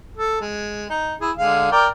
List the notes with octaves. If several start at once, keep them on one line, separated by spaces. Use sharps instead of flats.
A4
G#3
D#4
E4 G#4
D3 G#3 F5
A#4 D5 G5